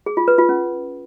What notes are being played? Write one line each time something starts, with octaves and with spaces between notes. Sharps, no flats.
G#4
F4
B4
F4
C#4